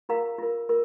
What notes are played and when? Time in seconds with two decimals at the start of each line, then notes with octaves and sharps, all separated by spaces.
0.09 F4 A#4 F5 A#5
0.38 F4 A#4
0.69 F4 A#4